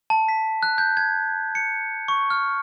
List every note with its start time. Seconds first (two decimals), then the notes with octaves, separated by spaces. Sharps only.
0.10 A5
0.28 B6
0.63 F#6
0.78 G6
0.97 G#6
1.55 C#7
2.08 C#6
2.30 F6